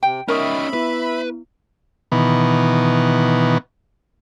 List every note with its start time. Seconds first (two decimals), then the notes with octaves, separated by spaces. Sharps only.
0.03 C3 G5
0.28 C#4 D#4 A#4 E5 G5 B5 C#6 D#6
0.73 B3 E4 B4
2.12 B2 D#3 E3 B3